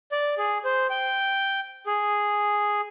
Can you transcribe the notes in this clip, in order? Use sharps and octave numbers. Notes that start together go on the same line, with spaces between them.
D5
G#4
C5
G5
G#4